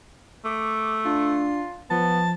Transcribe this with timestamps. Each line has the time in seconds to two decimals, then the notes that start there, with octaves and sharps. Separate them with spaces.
0.45 A3 D6
1.05 D4 F4
1.91 F3 B3 A5